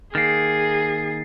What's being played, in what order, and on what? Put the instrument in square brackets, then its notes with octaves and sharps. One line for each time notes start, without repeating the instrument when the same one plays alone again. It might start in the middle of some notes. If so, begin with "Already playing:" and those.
[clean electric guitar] D#3 A#3 [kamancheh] G#4 [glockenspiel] A6 C7